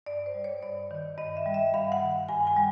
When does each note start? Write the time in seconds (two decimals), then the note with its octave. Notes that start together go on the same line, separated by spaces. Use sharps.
0.06 G2 D5
0.26 C5
0.34 G3
0.44 C#5
0.63 G2 D5
0.91 D#3
1.17 G2 D#5
1.37 E5
1.46 G3
1.54 E5
1.73 G2 F5
1.92 F#5
2.01 D#3
2.29 G2 G#5
2.47 G#5
2.56 G3